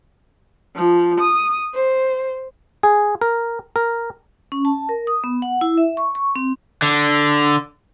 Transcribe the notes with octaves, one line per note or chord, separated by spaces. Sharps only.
F3
D#6
C5
G#4
A#4
A#4
C#4
A5
A#4
D#6
B3
F#5
E4
E5
C#6
C#6
C4
D3